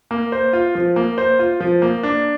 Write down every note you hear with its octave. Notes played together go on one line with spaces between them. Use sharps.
A#3
C5
F4
F3
A#3
C5
F4
F3
A#3
D4